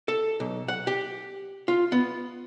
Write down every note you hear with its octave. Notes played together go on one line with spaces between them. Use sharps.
A4
B1
F#5
G4
F4
B3